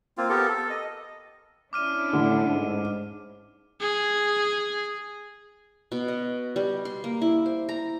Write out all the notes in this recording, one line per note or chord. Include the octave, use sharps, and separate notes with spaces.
A#3 C4 F4
B3 G4 A4 A#4
A4
D#5
C#4 D4 E4 D6 F6 D#7
A2 D3
G#2
G#4
B2
D#5
G3
C6
A#3
E4
C5
A#5